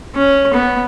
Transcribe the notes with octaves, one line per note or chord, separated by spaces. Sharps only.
C#4
B3